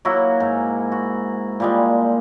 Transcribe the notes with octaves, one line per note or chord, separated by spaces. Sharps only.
F#3 A#3 E4 F#4
G#2
F#4
A#2 G3 G#3